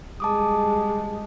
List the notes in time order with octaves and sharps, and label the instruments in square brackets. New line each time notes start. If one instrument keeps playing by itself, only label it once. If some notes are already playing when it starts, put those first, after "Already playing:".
[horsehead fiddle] G3 G#3 [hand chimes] A5 D6 D#6